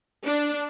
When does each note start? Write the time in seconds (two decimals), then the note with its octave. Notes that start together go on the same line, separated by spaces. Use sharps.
0.24 D4